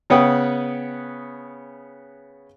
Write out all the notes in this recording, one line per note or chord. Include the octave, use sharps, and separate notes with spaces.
C#3 B3 C#5 F#5 G5 D#6